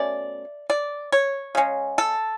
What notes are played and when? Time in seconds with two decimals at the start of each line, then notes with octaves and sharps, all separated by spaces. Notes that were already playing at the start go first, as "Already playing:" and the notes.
Already playing: B2 A3 C#4 D5
0.70 D5
1.12 C#5
1.55 C#3 G#3 C#4
1.98 A4